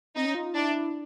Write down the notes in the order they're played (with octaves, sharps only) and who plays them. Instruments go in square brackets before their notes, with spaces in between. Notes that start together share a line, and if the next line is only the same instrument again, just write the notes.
[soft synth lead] C4 [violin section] D#4
[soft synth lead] C#4
F4
F4
[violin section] D4 [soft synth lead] E4